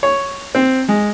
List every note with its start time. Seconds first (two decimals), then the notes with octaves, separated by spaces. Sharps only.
0.03 C#5
0.55 C4
0.88 G#3